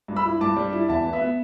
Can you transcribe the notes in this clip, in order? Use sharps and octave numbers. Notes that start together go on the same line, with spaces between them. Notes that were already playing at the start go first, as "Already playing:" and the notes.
G2
B5 E6
E4
G2 A5 D6
G3
E4
E2 E5 A5
B3
B4 E5
B3